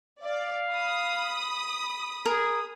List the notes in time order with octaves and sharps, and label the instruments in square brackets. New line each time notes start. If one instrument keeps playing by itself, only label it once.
[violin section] D5 [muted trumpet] F5
[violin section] B5 D#6
[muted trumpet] G#4 [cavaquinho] A#4